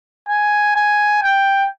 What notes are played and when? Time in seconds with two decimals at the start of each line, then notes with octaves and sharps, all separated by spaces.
0.29 G#5
0.76 G#5
1.23 G5